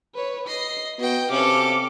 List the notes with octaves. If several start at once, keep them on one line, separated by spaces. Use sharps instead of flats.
B4 C#5
D#5 C7
B3 F#4 D#5 G5
C3 C#4 A4 F5 D6